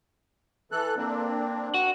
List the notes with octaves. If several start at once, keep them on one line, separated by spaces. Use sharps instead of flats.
E3 A4 F#6
A#3 C4 D4
F#4